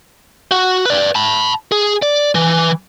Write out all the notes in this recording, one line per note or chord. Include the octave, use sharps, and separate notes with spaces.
F#4
B4 D5
A5 B5
G#4
D5
E3